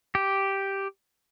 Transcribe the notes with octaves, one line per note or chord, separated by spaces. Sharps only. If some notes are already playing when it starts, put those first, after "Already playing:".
G4